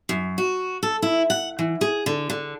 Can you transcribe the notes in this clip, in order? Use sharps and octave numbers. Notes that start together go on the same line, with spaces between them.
F#2
F#4
A4
E4
F#5
E3
G#4
D3
D3